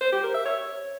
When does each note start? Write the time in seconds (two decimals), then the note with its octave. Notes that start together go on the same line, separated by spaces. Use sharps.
0.01 C5
0.12 G4
0.23 A#4
0.34 E5
0.45 C#5